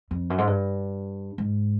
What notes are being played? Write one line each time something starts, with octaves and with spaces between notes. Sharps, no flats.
F2
F#2
G#2
G2
G#2